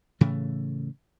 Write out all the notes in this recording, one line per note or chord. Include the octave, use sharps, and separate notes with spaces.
A2 C#3 E3 A3